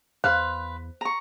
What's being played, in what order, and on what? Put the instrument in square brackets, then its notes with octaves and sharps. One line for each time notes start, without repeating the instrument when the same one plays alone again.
[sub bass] E2 [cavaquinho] B4 F5 C6 [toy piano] C5
[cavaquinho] A#5 C#6